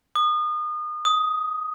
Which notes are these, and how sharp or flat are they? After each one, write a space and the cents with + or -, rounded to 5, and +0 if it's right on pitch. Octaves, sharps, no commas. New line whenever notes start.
D#6 -30
D#6 +10